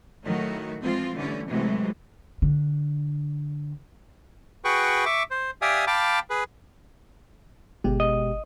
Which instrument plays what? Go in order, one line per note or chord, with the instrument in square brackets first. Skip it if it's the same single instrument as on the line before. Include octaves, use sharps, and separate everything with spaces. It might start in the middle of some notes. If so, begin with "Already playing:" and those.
[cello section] A2 D#3 F#3 A3 F#4
E3 F3 G#3 C4 F4
D3 E3 G3 A3 C#4
A2 C3 E3 F#3 G#3
[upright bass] D3
[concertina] F#4 G#4 B4 G5 C#6
E5 C#6 D6
C5
G4 D5 E5 F5 G#5 D#6
F5 G5 A5 B5 D6
G#4 B4
[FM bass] G1 [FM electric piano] B2 G#3 G4
[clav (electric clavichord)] D#5